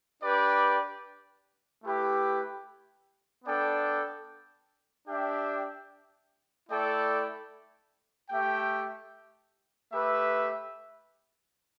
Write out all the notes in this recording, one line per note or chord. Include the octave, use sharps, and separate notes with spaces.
D4 G4 B4 D5 G5
A3 E4 G4 B4
B3 D4 A4 D5 G5
D4 G4 E5 G5
A3 E4 A4 D5 G5
A3 G4 E5 G5
A3 G4 B4 E5